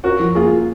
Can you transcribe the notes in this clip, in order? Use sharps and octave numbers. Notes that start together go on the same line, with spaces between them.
C#4 F#4 A#4
F3
A#3 F4 G#4
A#3